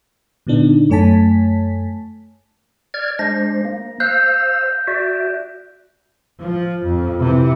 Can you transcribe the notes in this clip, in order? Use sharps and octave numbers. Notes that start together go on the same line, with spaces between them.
A#2 D3 B3 D4 D#4
F#2 A3 C#5 G#5 A5 B6
D5 F6 G#6
G#3 D4 C5 A#6
A#3
C5 F5 E6 F#6 G6
F#4 D5 E5
F3
F2
C3 E3